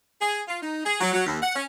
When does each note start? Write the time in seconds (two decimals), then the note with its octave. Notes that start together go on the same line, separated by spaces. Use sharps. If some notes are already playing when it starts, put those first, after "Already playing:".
0.20 G#4
0.48 F4
0.62 D#4
0.85 G#4
1.01 F#3
1.13 F#3
1.26 D#2
1.41 F#5
1.55 C#4